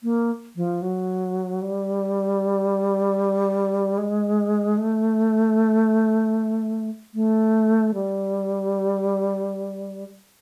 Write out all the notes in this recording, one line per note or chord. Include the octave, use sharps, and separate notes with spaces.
A#3
F3
F#3
G3
G#3
A3
A3
G3